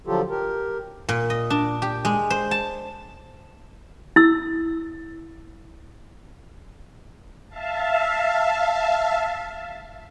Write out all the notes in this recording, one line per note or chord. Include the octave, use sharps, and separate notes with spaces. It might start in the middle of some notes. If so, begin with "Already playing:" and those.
D3 F3 F#3 F4 G4 A4
G4 A#4
A#2
D#5
D4
G4
G#3
C5
A5
E4 E6
E5 F5 A5